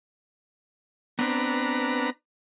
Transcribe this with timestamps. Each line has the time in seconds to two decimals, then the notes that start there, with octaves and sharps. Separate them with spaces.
1.19 B3 C4 D4 B4 A#5